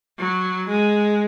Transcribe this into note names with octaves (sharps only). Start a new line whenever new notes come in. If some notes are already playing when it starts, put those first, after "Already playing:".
F#3
G#3